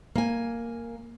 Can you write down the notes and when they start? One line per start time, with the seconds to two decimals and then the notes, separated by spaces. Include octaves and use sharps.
0.16 A#3 G#5